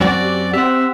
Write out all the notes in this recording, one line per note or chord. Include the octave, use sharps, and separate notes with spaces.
F#2 C4 F#4 D5
G4
C4 G4 E5 F#5